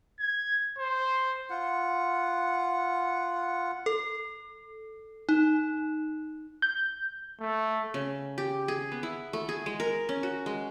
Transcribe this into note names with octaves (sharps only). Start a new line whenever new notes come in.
G#6
C5
F4 F#5
A4
D#4
G6
A3
C#3
G4
G#4
B3
E4
A3
G#4
G#3
A#4
C#4
F#4
G#3